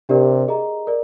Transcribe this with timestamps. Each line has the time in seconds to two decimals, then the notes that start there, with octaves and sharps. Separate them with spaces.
0.09 C3 D4 G4 A#4 D5
0.48 G#4 D#5 A#5
0.87 A#4 D5